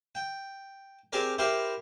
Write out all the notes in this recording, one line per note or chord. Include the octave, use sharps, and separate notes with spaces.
G5
C4 G4 G#4 A#4 D5
E4 G4 A#4 C5 G5